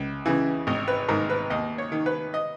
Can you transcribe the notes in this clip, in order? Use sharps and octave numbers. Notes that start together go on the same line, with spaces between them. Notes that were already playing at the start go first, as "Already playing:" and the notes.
Already playing: C#2
C#3 E3
G#1 D#5
B4
G#2 D#3 A#4
B4
D#2 D#5
C#5
D#3
B4
D#5